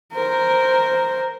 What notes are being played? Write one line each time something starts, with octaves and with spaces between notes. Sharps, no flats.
A#4 C5